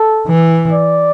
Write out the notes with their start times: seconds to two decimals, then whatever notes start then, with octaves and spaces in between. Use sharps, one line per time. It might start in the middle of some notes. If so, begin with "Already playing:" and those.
Already playing: A4
0.28 E3
0.72 D5